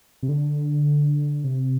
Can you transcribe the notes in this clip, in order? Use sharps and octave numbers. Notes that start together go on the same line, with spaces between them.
C3
D3
C3